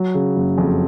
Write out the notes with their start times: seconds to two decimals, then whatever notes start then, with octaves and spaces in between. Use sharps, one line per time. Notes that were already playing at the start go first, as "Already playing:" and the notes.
Already playing: F#3
0.14 C#3
0.36 F#1
0.58 F2